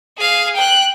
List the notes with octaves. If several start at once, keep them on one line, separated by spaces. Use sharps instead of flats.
G#4 F5
G5 F#6